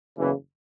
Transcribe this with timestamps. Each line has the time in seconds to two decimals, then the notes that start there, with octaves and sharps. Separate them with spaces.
0.17 F#1 E2 C#3 E3